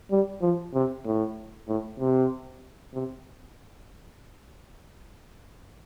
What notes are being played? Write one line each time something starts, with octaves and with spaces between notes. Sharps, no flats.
G3
F3
C3
A2
A2
C3
C3